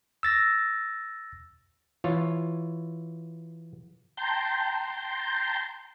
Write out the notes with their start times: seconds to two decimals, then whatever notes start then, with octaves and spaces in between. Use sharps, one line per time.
0.23 E6 A6 A#6
2.04 E3 F4 C#5
4.17 G5 A5 A#5 C6 G6